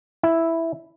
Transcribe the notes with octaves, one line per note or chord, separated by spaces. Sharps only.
E4